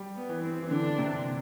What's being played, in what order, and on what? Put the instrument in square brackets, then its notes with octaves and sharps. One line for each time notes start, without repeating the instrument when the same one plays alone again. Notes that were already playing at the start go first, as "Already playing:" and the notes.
Already playing: [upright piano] G3
[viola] B3
[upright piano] E3
[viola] C4
[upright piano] E3
[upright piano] D3 [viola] D4
[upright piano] C3